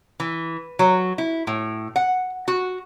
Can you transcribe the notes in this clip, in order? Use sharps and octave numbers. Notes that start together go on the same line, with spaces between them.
E3
F#3
E4
A2
F#5
F#4